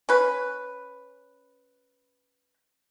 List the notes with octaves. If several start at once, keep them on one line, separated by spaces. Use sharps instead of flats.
C#4 B4